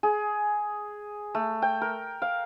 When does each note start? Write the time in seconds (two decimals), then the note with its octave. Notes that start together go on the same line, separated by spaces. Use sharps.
0.03 G#4
1.35 A3
1.62 G5
1.81 A#4
2.22 F5